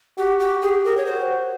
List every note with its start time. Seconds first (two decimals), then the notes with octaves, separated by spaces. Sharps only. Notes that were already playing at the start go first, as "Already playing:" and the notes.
0.18 F#4 G4
0.40 G4
0.62 G4 G#4
0.84 A#4
0.97 C#5
1.06 F#4 C5